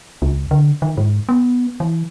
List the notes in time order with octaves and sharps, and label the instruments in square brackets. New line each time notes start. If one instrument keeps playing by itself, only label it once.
[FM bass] C#2
D3
D#3
G#2
B3
E3